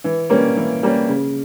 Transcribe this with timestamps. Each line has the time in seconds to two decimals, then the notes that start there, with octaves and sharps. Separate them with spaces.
0.04 E3
0.30 G3 A#3 C#4
0.57 E3
0.83 G3 A#3 C#4
1.08 C#3